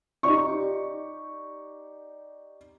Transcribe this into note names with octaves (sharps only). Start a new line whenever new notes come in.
D#4 G4 D5 C#6